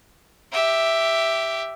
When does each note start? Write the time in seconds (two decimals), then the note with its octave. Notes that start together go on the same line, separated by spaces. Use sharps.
0.52 G4 E5